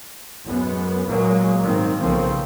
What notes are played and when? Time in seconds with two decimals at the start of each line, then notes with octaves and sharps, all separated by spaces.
0.45 F#2 G#3 B3
1.08 A#2 F#3 G#3 A#3
1.62 G#2 D#3 A#3 C4
1.99 B1 C#3 F3 A#3 C4